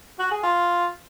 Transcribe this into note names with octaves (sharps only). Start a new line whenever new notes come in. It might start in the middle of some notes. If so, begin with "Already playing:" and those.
F#4
G#4
F4